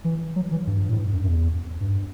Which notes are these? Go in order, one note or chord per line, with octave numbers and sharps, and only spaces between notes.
E3
F#3
E3
G2
A2
G2
F#2
F#2
E2
G2